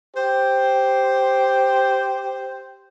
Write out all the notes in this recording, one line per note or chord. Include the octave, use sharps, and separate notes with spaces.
G4 C5